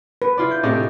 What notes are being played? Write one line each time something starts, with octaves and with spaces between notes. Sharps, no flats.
B4
E4 F4 D5
G6
A2 C3 G#3 D5 D#5